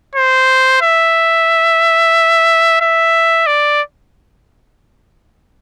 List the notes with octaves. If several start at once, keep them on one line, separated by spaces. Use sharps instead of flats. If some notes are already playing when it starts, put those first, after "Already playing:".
C5
E5
E5
D5